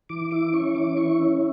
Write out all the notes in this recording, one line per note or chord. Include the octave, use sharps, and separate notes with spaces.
E3 D6
E4 D6
C#4 C#6
E3 D6
E4 C#6
C#4